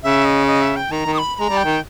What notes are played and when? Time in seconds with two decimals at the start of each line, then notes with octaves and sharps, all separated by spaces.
0.03 C#3 E5
0.25 D#5
0.47 D#5
0.61 E5
0.76 G5
0.91 D#3 A#5
1.06 D#3
1.14 D#6
1.18 B5
1.36 B5
1.39 G#3 A#5
1.50 G3
1.57 G5
1.65 D#3